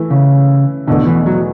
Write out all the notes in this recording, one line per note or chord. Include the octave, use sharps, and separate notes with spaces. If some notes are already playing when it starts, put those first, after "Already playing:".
Already playing: E3 A3 E4
C#3
E2 B2 D3 A3
E3
F#3